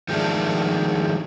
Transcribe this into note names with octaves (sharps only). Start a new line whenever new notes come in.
D#3 F3 G#3 A3 D4